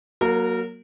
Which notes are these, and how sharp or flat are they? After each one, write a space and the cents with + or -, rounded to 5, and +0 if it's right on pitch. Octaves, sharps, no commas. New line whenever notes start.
F#3 +0 A#3 +25 A#4 -25